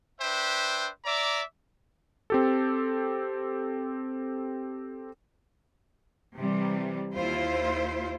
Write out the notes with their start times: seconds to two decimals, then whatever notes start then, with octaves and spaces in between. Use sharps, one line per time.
0.21 D4 B4 C5 E5 G5
1.05 D5 E5 A#5 D6
2.30 C4 G4 A4
6.36 C3 E3 G3
7.14 D#2 E4 F4 C5